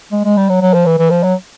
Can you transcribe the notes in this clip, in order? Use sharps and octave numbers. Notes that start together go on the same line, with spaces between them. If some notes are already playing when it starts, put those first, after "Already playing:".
G#3
G#3
G3
F#3
F#3
F3
E3
E3
F3
F#3